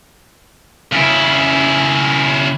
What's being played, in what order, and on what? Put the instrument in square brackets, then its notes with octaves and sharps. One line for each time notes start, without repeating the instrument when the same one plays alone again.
[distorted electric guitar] C#3 E4